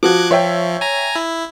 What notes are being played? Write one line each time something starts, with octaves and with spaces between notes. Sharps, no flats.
F3 F#4 D6 F#6 G#6
F3 C#5 E5 G5
G#5 A#5
E4